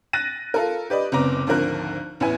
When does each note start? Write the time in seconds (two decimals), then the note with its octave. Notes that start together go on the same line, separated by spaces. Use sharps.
0.13 F#6 A6 A#6 D#7
0.54 F4 A4 A#4
0.90 G4 B4 D5 D#5
1.12 F#1 C3 B3 A#5 D6
1.47 G#1 D2 D3 F3 A#4 F#6
2.20 A1 E2 B3 E4 G#5